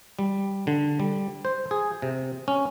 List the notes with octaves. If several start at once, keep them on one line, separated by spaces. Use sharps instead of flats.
G3
D3
G3
C5
G#4
C3
C#4